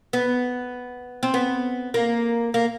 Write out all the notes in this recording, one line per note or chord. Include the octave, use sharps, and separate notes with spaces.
B3
C4
B3
A#3
A#3